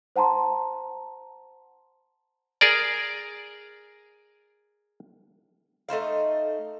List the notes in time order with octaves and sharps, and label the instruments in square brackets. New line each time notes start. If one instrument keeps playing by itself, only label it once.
[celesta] C5 F#5 A5 A#5 C6
[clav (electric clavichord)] G#4 A#4 D5
[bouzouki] A3 D#4 C5 F5